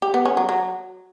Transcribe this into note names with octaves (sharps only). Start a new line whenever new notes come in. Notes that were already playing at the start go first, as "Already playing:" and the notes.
G4
B3
C#4
F#3
F#3